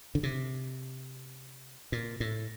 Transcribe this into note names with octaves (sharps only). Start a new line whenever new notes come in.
D3
C3
A#2
A2